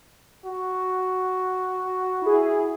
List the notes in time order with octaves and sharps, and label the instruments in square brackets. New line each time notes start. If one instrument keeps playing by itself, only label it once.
[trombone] F#4
[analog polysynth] E4 G#4